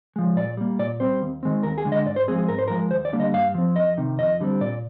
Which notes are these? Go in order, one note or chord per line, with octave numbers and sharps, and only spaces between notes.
F3 G#3
A#2 D5
G3 A#3
A#2 D5
G3 C4 C5
D#2
D#3 G#3 C4
D#2 A#4
G#4
D3 G#3
D#5
G#2 D5
C5
F3 G#3 C4 G#4
G#4
G#2 A#4
C5
F3 G#3 A#4
D#2 C5
D5
D3 G3 A#3
D#5
G2 F5
F3 C4
F2 D#5
C3 D#3
F2 D#5
D3 G3 C4
A#2 D5